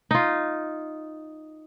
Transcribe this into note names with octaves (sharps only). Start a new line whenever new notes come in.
D#4 F4